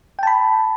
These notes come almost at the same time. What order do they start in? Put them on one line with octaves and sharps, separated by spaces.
G5 A5 B5